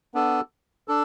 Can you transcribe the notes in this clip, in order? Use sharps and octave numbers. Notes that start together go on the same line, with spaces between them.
B3 D4 A4
D4 A4